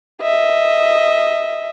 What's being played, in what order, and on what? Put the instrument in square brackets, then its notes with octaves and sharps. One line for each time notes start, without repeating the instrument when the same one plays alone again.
[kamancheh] D#5 E5